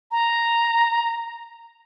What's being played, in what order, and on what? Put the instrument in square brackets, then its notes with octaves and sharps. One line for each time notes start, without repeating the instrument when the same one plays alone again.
[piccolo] A#5